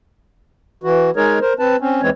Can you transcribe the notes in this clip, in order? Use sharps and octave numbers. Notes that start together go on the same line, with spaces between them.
E3 F#4
G#3 D#4 G#4 A#4 C#5
A#4 C5
C4 B4 A5
C4 C#4
D#2 E3 G#3 C4 C#5